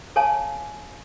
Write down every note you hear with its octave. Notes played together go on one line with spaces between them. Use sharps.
A4 C#5 F5 G#5 A5